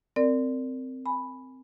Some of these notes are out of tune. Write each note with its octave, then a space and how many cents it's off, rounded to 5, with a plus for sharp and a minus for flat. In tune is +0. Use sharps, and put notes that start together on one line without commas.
C4 -10 A#4 -25 D5 +0
G#5 +0 B5 +0